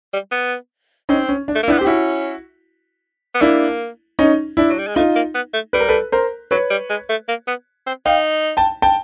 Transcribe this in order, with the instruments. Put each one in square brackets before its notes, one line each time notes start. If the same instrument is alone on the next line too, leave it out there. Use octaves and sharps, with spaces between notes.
[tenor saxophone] G3
B3
[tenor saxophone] C4 [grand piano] C#4 D#4
[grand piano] C#4
D4
[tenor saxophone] A3
A#3
[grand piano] D4 E4
[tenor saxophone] B3
[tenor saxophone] C4 [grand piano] G4
[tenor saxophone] C#4 [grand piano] E4 F#4
[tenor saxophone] B3
[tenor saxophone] A#3 [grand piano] D4 E4
[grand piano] C#4 D#4
D4 E4
[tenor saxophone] F#3
G3
G#3
[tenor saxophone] A3 [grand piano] D#4 F4
[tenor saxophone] A#3
B3
A3
[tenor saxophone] G3 [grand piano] B4
[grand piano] A#4
A4 B4
A#4 C5
[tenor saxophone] F#3 [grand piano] B4 C#5
[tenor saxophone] G3
G#3
A3
A#3
B3
C4
[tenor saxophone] D#4 [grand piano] F5 G5
[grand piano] G5 A5
G5 A5